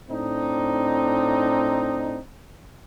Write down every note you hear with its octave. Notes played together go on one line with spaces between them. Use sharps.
A2 C4 D4 D#4